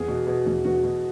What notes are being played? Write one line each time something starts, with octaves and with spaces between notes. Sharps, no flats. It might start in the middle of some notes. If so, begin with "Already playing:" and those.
Already playing: E2 G#4
B2
B2 G#4
E2
E2 F#4
B2